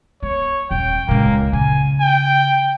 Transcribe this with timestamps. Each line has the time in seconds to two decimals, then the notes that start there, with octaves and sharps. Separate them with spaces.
0.23 B3 C#5
0.71 D#1 G5
1.08 C#2 A#2 A#3
1.53 C#3 G#5
2.01 G5